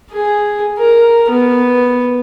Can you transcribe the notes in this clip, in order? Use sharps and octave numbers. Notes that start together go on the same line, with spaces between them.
G#4
A#4
B3